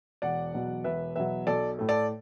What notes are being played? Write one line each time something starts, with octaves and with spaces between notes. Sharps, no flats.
E1 D5 F#5
E2 B2 F#3
E1 B4 E5
E2 B2 F#3 B4 E5
B1 A4 D5
A2 A3
A4 D5